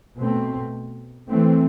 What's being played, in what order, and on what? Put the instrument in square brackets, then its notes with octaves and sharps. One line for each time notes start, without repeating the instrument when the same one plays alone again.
[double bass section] B2 A3 C4
E3 A3 C4